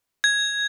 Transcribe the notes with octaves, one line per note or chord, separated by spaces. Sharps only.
G#6